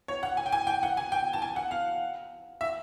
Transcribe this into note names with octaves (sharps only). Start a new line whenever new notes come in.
C#5
F#5
G#5
G5
G#5
G5
F#5
G#5
G5
A5
G#5
F#5
F5
E5